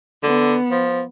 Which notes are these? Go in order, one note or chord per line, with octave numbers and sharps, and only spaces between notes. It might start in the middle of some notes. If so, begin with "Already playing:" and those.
D3 B3
F3